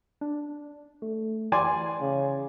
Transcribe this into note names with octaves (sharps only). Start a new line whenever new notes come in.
D4
A3
E3 D5 G#5 C6
C#3